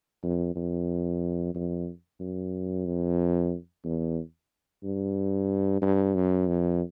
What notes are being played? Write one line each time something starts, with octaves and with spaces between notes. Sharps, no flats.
F2
F2
F2
F#2
F2
E2
G2
G2
F#2
F2